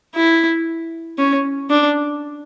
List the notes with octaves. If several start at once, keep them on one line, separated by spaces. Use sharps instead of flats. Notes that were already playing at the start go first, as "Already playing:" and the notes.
E4
C#4
D4